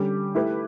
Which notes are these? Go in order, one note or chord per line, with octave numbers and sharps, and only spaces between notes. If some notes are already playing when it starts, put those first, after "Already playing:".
Already playing: D3 G3 C#4 G4
A3 E4 G4 B4